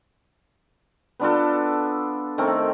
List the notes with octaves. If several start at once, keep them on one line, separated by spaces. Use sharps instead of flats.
B3 D4 F4 A4
D#3 A3 C4 A#4